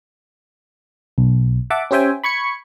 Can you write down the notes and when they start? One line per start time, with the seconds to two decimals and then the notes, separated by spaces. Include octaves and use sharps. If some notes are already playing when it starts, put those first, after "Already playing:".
1.18 B1
1.70 E5 F#5 A5 D6
1.91 C#4 G4 C5 E5 G5 G#5
2.24 B5 C#6 G#6 C#7